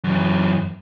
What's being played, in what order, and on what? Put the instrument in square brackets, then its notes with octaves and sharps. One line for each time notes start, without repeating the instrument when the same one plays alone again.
[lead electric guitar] F#2 E3